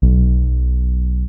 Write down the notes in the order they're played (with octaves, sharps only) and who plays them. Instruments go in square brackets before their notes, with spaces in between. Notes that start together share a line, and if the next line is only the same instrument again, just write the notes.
[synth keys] B1